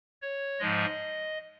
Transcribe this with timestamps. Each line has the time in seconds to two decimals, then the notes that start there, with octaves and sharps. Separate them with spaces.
0.22 C#5
0.60 G#2 F3 G#3 D#5